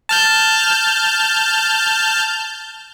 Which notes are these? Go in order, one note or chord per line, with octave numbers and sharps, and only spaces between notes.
A5 F6 G6